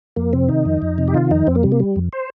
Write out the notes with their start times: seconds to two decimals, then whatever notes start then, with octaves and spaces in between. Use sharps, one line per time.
0.16 F2 A#3
0.33 C3 C4
0.48 D#3 D#4
0.65 F2
0.82 F2
0.98 C3
1.08 G4
1.14 D#3 F4
1.31 F2 D#4
1.47 F2 C4
1.55 A#3
1.63 C3 G3
1.72 A#3
1.80 G3
1.96 F2
2.13 C5